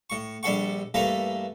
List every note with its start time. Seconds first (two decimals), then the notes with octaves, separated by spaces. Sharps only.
0.10 A2 C#6
0.43 A#1 G3 D4 A4 F#5 C#6
0.94 G2 E3 A3 A#3 A4 A#5